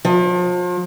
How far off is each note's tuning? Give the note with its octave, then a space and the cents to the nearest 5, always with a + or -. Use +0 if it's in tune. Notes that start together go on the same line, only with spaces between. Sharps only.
F3 +35